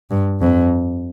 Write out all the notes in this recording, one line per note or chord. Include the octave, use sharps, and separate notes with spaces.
G2
F2